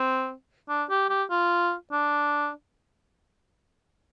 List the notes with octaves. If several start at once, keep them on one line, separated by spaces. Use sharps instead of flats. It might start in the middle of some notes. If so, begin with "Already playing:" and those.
Already playing: C4
D4
G4
G4
F4
D4